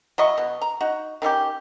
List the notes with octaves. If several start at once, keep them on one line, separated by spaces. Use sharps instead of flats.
F#3 E4 D#5 C#6
B2
A#5
D#4 F#4
D#3 C#4 E4 G4